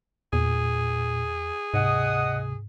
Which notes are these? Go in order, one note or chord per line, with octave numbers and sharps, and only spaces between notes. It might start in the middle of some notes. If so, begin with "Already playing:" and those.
E2 A#2 G#4
D2 G#2 C3 D#5 F#5 D#6